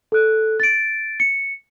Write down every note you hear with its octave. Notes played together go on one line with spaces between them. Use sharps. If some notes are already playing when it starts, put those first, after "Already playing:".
A4 F#6
A6 D7
C#7